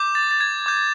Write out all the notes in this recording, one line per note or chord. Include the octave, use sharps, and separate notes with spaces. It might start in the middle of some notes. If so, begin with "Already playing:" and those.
Already playing: D6 G6
A6
A6
G#6
D6 G6